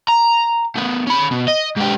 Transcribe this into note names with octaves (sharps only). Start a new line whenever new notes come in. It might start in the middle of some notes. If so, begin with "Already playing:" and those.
A#5
A3 B3
C#4 B5
B2
D#5
G#2 G4